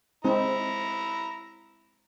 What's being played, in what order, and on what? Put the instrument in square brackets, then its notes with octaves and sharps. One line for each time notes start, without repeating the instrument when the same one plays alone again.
[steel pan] G#3 C4 D#4 [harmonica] E4 A#5